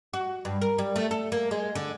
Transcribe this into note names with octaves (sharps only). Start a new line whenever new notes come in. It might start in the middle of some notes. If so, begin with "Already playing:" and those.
F#4
G2
A#4
G3
A3
A4
A#3
G#3
D3